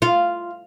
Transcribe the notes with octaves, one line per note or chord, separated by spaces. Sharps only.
F4